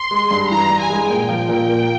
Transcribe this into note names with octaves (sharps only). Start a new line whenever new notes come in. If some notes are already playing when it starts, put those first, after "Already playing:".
Already playing: C6
G#3
G2
E3 A#5
G2
G#5
G#3
A#2 G5
F3
A#2
A#3